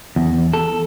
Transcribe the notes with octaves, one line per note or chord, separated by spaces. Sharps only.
E2
A4